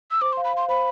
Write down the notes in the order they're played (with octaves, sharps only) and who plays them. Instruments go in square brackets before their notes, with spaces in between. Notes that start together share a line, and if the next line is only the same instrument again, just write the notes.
[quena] E6
[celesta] C5 [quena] D6
[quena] C6
[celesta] F5
[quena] B5
[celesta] F5 [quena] C6
[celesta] C5 [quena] B5